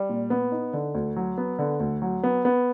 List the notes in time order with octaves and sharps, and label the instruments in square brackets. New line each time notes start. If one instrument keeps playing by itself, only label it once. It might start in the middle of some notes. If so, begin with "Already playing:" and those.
Already playing: [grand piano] G3
A#2
B3
D#4
D3
D2
F#3
B3
D3
D2
F#3
B3
B3